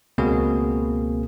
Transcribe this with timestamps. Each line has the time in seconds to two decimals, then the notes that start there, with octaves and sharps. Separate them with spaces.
0.18 C#2 B2 A#3 C4 G#4